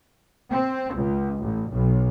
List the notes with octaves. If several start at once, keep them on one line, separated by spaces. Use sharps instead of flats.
C4
C#2
A1
B1